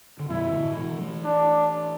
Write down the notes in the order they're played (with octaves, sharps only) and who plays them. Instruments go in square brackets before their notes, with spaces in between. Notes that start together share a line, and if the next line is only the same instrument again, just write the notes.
[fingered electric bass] D3
[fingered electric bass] F#2 B2 [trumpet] E4
[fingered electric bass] E3
A2 D3
B2 E3
E3 A3
[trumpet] D4